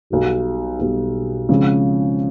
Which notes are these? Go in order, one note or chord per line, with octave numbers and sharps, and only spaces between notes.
B1 B2 G3
B1 B2 G3
C#3 F3 G#3 C4